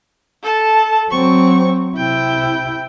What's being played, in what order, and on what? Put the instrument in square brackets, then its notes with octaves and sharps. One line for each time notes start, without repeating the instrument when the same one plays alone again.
[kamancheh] A4 A5
[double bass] F#3 C4 [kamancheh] C#6
[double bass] C3 E4 [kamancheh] G5